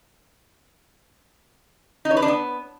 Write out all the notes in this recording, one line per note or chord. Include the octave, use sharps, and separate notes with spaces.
D#4
C#5
B4
D4
B3